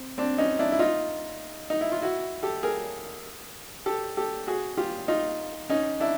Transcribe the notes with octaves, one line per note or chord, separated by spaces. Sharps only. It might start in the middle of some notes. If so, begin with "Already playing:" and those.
Already playing: C4
C4 D4
C#4 D#4
D4 E4
E4
D#4 F4
D#4
E4
F4
E4 F#4
G4 A4
G#4 A#4
G4 A4
G4 A4
F#4 G#4
F4 G4
D#4 F4
C#4 D#4
D4 E4